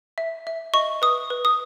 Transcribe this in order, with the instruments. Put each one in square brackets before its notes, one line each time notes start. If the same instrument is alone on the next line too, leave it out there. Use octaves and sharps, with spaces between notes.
[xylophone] E5
E5
D#5 C#6
B4 D#6
B4
D#6